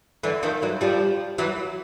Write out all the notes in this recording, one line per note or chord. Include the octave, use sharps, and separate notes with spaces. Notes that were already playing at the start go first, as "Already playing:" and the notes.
D3 E3
D#3 F3
E3 F#3
F3 G3
E3 F#3